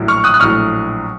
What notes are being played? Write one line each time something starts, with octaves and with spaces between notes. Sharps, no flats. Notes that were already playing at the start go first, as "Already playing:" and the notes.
Already playing: A#1 A2 F#3
C#6 F6
D#6 F#6
F#6
A#1 A2 F#3 C#6 F6